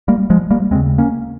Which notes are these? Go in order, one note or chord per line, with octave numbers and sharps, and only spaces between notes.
G3 A#3
F3 G#3
G3 A#3
D#2 C#3 G#3 C4
A#3 C#4